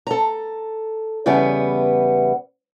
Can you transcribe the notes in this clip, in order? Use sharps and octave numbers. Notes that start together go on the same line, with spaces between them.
A4 A#5
E2 C#3 G3 B3 B4 E5